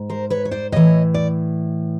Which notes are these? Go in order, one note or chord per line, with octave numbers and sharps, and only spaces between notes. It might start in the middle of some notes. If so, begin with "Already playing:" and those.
Already playing: G#2
A#4 C5
B4 C#5
C#5
C5 D5
A2 E3 C#5 D#5
D5